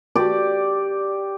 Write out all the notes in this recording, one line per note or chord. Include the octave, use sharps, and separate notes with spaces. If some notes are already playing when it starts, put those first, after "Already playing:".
G4 D5